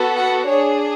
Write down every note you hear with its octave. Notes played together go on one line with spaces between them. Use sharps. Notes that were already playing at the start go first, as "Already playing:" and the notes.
Already playing: B3 F#4 A4
F#5
D4 G#4 C#5